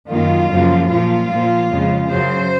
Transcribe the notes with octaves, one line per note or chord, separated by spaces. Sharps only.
F#2 D#3 A#3 F4
F#2 C#3 F3 A#3
A#2 F3 A#3 F4
A#2 F3 A#3
F2 C#3 G#3
F#2 C#3 F#3 C5